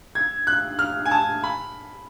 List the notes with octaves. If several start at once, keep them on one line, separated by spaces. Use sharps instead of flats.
G#6
F#6
F6
G#5
A5
B5